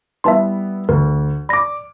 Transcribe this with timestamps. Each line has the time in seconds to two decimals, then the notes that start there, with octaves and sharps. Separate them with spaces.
0.24 G3 B3 E4 E5 A5 C6
0.89 D2 A#4 B4
1.49 D5 B5 D6 A#6